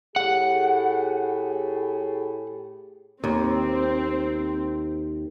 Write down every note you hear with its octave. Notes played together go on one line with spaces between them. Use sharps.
A2 G4 G#4 F#5
D#2 C4